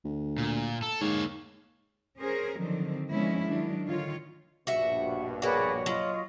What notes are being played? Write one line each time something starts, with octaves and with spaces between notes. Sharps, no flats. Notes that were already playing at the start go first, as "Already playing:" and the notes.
D2
A#2
A4
G#2 A#3 C#5
C#4 G#4 A#4 C5
D3 D#3 F3 F#3 C4
D3 F3 G#3 B3 C#4 E4
D#3 F#3 D4
D3 D#3 F4 C#5
A#1 G2 B2 F#4 E5
A#3 F#4 G#4 B4 C#5 D5
F#3 F4 D#5